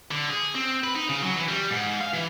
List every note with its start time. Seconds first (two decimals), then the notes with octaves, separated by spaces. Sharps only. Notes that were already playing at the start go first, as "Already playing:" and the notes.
0.11 D3
0.29 G#4
0.55 C4
0.84 B4
0.95 D#4
1.09 C#3
1.22 F#3
1.36 E3
1.48 G3
1.71 G#2
2.01 F5
2.14 E3